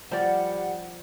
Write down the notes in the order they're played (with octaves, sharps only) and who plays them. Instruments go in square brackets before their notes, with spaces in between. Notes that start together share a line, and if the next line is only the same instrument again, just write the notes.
[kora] F3 D5 [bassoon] G3 [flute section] F#5